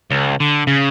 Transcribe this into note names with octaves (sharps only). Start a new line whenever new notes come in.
C#2
D3
C#3